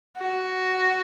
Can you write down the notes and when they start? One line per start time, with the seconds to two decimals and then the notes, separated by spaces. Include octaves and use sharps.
0.18 F#4